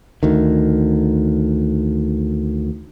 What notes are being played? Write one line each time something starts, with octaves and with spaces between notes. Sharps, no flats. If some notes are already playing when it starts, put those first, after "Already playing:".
D2 D#3